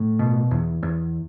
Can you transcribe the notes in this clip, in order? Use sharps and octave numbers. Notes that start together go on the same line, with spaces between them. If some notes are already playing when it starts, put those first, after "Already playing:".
Already playing: A2 A3
B2
E2
E2